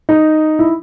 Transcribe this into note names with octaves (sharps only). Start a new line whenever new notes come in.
D#4
E4